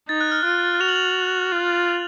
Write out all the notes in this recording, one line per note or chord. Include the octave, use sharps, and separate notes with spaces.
D#4 A6
F#6
F6
F4 F#6
F#4 F7
F#7
F7
F4